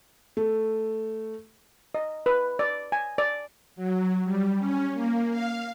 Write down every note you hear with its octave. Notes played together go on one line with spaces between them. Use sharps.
A3
D#5
B4
D5
G#5
D5
F#3
G3
C#4
A#3
F5